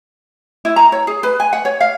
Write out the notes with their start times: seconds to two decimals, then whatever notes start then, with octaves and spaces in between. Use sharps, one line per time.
0.65 E4
0.76 A#5
0.92 C#5
1.07 G#4
1.23 B4
1.40 G#5
1.53 F#5
1.65 C#5
1.81 F5